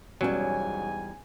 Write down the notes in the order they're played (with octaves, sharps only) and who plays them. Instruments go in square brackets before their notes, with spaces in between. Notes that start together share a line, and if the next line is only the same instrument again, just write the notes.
[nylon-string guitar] E2 G3 [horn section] G#2 G#5 [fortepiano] B2 C#4 [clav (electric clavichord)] F#3